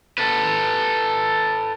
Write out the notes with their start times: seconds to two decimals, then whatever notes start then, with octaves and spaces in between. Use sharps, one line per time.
0.18 A4 B4